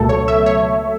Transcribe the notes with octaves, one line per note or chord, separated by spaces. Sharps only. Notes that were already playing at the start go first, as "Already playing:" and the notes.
Already playing: C#2 B2 F#3 A3 A4
C#5
E5
C#5